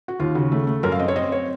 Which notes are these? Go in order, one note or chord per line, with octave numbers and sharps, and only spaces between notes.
F#4
D#2 F4
C#3 F#4
A3
A3
F#2 A#4
F5
C4 D#5
C#5
C4 D#5
C#5